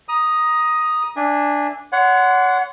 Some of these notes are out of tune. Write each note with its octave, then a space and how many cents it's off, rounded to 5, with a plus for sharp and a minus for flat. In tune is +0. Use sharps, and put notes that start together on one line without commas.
A#5 +20 D#6 +0
D4 +0 E5 +0 G#5 -20
C#5 +35 F#5 +0 C6 -20